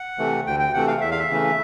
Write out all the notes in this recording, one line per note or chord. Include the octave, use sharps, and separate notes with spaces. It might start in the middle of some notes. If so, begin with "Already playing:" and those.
Already playing: F#5
C3 E3 A3
D2 G5
G5
C3 E3 A3 F#5
F5
E2 E5
F5
E5
C#3 E3 A3